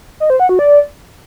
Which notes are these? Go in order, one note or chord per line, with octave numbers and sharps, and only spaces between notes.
D#5
C5
F#5
F#4
D5